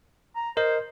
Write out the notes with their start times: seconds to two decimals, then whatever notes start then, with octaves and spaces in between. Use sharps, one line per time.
0.36 A#5
0.57 A#4 C5 D#5